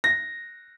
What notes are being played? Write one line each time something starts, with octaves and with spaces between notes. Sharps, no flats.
A#6